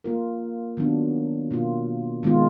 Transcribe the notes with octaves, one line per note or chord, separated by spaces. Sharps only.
A#3 F4 A#4
D#3 F#3 B3 D4
B2 A#3 F4
D#3 G#3 B3 F4